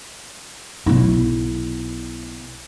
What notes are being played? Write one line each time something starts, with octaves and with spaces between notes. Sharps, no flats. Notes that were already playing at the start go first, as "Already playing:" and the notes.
B1 E4